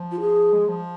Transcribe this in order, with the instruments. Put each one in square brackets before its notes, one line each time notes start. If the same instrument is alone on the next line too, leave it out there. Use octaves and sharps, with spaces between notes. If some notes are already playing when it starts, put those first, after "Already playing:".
Already playing: [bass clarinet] F3
[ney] F4
G#4
[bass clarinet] G#3
F3